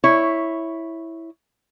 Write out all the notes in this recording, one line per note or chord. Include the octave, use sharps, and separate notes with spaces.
E4 C#5